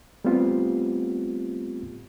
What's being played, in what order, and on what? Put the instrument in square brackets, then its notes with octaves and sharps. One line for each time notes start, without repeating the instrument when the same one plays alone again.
[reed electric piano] G3 A3 B3 C4 F4 G4